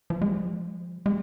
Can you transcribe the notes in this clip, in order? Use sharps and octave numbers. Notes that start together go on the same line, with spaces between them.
F3
G#3
F3
G#3